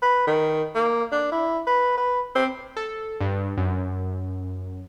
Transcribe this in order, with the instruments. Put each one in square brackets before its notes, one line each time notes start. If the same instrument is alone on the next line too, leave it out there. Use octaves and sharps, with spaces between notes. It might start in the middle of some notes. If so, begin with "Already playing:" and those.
[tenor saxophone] B4
D#3
A#3
D4
E4
B4
B4
C4
[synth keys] A4
G2
F#2